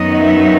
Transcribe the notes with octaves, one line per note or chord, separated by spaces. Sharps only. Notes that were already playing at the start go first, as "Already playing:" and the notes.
Already playing: F#2 D#3 F#3 B3 D#4 D#5
E5